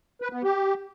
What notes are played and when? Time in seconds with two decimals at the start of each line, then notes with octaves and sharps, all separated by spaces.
0.22 B4
0.33 B3
0.43 G4